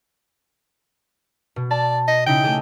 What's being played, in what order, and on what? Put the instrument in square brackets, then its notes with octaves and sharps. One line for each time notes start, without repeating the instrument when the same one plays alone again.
[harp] B2
[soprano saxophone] D5 [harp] A5
[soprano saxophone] D#5
[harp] C#3 D#4 E4 [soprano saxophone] G5
[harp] A3 G4 G#4